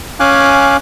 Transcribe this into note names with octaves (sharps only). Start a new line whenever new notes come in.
C#4 F5 G#5 D6 F#6